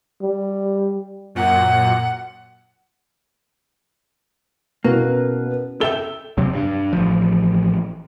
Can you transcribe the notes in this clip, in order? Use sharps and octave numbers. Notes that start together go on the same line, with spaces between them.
G3
F#2 A#2 F#5
B2 A#3 C#4 E4 B4
A4 E5 G5 G7
F2 C3 F#3 C4
G2
A1 F3